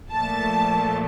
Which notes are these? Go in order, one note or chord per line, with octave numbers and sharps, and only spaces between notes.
A#2 F3 A3 A5